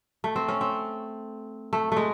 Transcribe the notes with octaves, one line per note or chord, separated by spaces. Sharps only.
A3
C4
C#4
C4
A3
G#3 A3